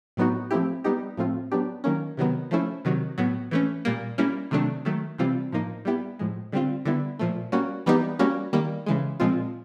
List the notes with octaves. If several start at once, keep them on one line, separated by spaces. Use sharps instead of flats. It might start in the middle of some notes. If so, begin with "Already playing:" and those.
A2 F#3 B3 D#4 F#4
F3 A3 C4 E4 G4
G3 B3 D#4 G4
A2 F3 A3 C4 F4
F#3 B3 D4 G4
D#3 F#3 A#3 C#4
C3 D#3 F#3 B3
F3 A3 C#4 E4
C3 D#3 F#3
A2 F#3 B3
E3 A3 C#4
A#2 G3 A#3
G3 A#3 C#4 E4
C3 D#3 F#3 A3 D4
D#3 F#3 A3
C3 E3 G3 C4 F4
A2 F3 A#3 D#4
G3 B3 E4 G4
A2 F3 G#3
D3 G3 C4 F4
D3 G3 B3 E4
A#2 F3 A3
G3 A#3 C#4 F#4
E3 G3 B3 D#4 G4
G3 A#3 C#4 F#4
D#3 G3 A#3
C#3 E3 G#3
A#2 F3 G#3 C4 F4